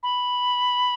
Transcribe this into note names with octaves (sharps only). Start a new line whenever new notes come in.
B5